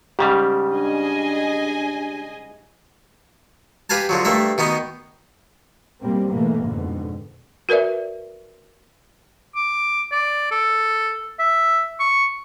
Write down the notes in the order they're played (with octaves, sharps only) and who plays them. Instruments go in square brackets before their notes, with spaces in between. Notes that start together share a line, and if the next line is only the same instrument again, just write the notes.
[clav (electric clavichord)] G#2 C#3 G3 [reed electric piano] G4
[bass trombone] D4 [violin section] G#4 D#5 G#5
[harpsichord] G4 B4 F5 G#5 A5
D3 F3 F#3
G2 A3 A#3 E5
B2 D#3 B3 D#4
[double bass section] B2 G3 A#3 C4
G#2 B2 E3 A3 A#3
F2 G#2 B2 D3
[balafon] F#4 A#4 B4 D5 E5
[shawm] D6
D5
A4
E5
C#6